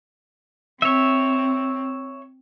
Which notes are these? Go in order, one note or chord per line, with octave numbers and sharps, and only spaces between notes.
C4 C#5 E5